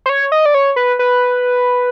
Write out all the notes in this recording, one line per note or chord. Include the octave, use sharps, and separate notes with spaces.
C5
C#5
D#5
D5
C#5
B4
B4